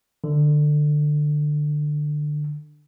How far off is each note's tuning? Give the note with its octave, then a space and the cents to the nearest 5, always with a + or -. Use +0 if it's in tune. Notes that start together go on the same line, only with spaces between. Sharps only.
D3 +20